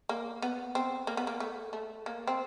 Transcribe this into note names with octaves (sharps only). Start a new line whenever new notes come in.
A#3
B3
C4
A#3
B3
A#3
A3
A3
A#3
C4